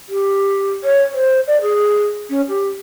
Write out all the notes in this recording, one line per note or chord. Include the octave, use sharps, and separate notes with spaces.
G4
C#5
C5
D5
G#4
C#4
G4